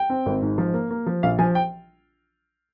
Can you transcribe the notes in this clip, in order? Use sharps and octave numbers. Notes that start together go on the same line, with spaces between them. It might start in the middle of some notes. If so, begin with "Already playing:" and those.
Already playing: G5
C4
G#1
G#2
F3
A#3
A#3
F3
A#1 F5
F3 G#5
G5